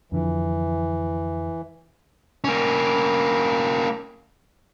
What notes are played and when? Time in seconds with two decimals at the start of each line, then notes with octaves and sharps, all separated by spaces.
0.12 F2 D3 E3 F3
2.44 A#3 C#4